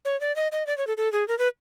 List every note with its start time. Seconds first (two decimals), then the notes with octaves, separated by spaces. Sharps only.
0.05 C#5
0.21 D5
0.36 D#5
0.52 D#5
0.67 D5
0.78 C#5
0.87 A4
0.97 A4
1.12 G#4
1.28 A#4
1.39 B4